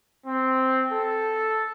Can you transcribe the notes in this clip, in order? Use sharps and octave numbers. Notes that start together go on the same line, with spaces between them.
C4
A4